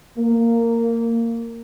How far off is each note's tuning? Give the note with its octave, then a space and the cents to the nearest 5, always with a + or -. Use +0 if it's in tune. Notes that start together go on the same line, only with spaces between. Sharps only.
A#3 -15